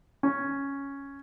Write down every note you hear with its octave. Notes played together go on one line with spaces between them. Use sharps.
C#4